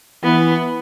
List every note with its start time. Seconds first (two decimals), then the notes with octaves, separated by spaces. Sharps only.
0.23 E3 B3